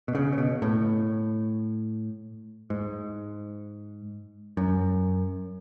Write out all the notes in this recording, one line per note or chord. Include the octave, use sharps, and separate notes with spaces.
B2
C#3
C#3
B2
A2
G#2
F#2